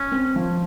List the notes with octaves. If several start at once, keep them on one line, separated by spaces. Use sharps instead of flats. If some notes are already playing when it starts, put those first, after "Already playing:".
Already playing: C#4
C4
F3